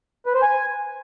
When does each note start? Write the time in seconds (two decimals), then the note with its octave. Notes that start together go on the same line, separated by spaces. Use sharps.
0.26 B4
0.34 C5
0.42 G#5